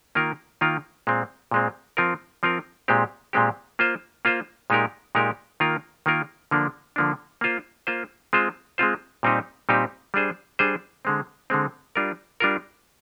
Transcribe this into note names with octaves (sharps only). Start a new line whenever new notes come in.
D#3 A#3 F4 A#4
D#3 A#3 F4 A#4
A#2 G#3 C4
A#2 G#3 C4
F3 C4 F4 A#4
F3 C4 F4 A#4
A#2 G#3 C4 G4
A#2 G#3 C4 G4
A#3 F4 C5
A#3 F4 C5
A#2 G#3 D#4 G4 A#4
A#2 G#3 D#4 G4 A#4
D#3 A#3 F4 A#4
D#3 A#3 F4 A#4
D3 F3 A#3 D4
D3 F3 A#3 D4
A#3 F4 C5
A#3 F4 C5
G#3 C4 F4 C5
G#3 C4 F4 C5
A#2 G3 C4 D#4 G4
A#2 G3 C4 D#4 G4
G3 D4 G#4 C5
G3 D4 G#4 C5
D3 G#3 C4
D3 G#3 C4
G3 D4 F4 A#4
G3 D4 F4 A#4